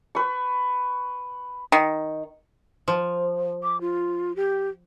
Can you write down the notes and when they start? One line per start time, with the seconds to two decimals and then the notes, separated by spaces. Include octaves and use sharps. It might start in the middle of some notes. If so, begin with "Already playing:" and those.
0.15 B4 C#6
1.72 D#3
2.88 F3
3.63 D6
3.81 F4
4.36 G4